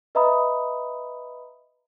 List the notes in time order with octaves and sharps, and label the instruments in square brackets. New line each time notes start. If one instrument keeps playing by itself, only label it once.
[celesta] B4 D#5 E5 A#5 B5 D#6